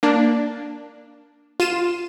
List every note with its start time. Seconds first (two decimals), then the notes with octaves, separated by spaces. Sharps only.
0.03 A#3 D4
1.60 F4 D#7 E7